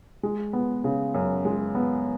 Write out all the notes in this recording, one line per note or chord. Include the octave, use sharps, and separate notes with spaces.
G#3
B3
C#3
F#2
G#3
B3